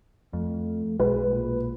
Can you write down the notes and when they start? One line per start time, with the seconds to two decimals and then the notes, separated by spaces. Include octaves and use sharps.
0.33 F2 A3
0.99 B1 G#3 B4
1.32 A#2